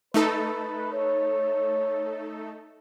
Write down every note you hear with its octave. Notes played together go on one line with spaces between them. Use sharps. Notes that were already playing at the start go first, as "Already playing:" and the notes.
A3 D#4 A4 B4
C#5